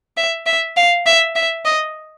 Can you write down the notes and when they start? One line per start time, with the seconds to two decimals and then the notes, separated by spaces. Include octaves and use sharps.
0.17 E5
0.46 E5
0.77 F5
1.06 E5
1.36 E5
1.65 D#5